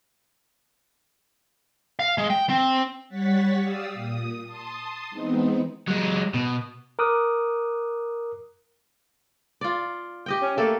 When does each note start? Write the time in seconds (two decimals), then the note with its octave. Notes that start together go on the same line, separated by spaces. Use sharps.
1.99 F5
2.18 G#3
2.30 G5
2.49 C4
3.09 G3 C#5 F#5 C#6 A6 B6
3.62 G4 D5 F5 D#6 E6
3.94 A#2 D#6
4.46 A5 C6 D#6
5.10 E3 G#3 B3 C4 D#4
5.88 F#3 G#3
6.34 B2
6.99 A#4 D6 D#6 F#6
9.61 F4 D5
10.26 G4 D#5 G5
10.42 C#4
10.57 A3 A#3 A4